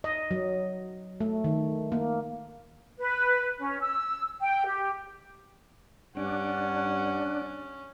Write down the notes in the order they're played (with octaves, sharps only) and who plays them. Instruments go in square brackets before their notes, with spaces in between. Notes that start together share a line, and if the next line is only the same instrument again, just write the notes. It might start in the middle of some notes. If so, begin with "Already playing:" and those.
[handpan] D#5
F#3
A3
D#3
A#3
[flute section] B4
C#4
E6
G5
G4
[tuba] G2 [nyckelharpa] C#4 [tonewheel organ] D4 [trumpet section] F#5